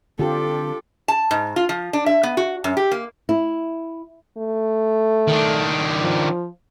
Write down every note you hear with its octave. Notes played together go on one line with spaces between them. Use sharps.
D3 C4 D4 F4 G4 A4
A5
G#2
F4
F3
D4
E5
B3
F#4
F#2
G4
A#3
E4
A3
D#3 D4
F3